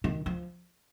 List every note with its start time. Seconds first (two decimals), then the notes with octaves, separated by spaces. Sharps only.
0.04 D#3
0.26 F3